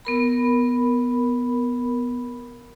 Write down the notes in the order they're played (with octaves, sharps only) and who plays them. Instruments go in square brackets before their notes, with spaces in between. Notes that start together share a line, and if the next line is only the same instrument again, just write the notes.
[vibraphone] B3 A#4 B5